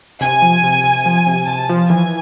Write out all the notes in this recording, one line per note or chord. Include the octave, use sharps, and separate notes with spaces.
C3 G#5
F3
C3
C3
F3
C3
C3 A5
F3
E3 G#5